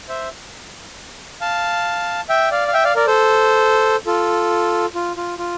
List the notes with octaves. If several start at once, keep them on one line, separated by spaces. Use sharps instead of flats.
C5 E5
F5 A5
E5 G5
D5 F5
F5
E5 G5
D5 F5
A#4 D5
A4 C5
F4 A4
F4
F4
F4